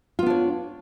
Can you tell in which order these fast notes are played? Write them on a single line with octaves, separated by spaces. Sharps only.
F4 B3 D4 C#5